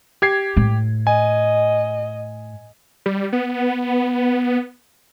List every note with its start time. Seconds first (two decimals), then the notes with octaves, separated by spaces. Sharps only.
0.22 G4 G#6 C7
0.57 A2
1.07 D#5 G#5
3.06 G3
3.32 B3